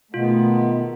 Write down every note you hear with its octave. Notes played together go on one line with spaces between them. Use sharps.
B2 D#3 G#3 A3 B3 F4